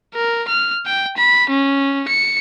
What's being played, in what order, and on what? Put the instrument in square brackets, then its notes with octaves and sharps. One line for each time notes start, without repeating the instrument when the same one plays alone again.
[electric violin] A#4
F6
G5
B5
C#4
C#7